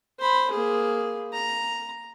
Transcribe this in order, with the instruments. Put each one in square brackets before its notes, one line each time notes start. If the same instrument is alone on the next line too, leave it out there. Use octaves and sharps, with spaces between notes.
[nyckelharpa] C5 B5
A#3 G#4
A#5